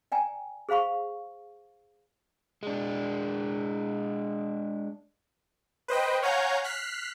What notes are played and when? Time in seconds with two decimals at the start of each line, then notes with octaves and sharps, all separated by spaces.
0.12 D5 G5 G#5 A#5
0.69 G#4 C5 F5 B5 C#6
2.63 G#3 D4
5.88 B4 C5 D#5 G5
6.23 C#5 F5 F#5 G#5 A#5 G6
6.64 F6 F#6 B6 C7